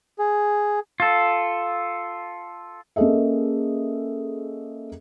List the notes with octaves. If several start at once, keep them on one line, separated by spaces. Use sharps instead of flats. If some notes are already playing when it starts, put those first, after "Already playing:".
G#4
F4 A4
A#3 C#4 G#4 A4 D#5 E5